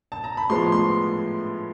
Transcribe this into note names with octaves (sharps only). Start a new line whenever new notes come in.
A5
A#5
B5
A2 F3 G#3 B3 C6
C6